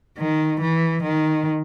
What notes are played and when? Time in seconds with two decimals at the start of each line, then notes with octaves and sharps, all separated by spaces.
0.18 D#3
0.61 E3
1.03 D#3